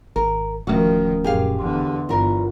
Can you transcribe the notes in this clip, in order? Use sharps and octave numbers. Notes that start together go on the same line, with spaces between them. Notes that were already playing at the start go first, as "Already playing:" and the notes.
G#1 A#4
D1 D#3 F3 A3 C#4 F#4
F#2 A#2 G4 G#4 F5
E2 D3 C6
G1 E2 E4 F4 A#4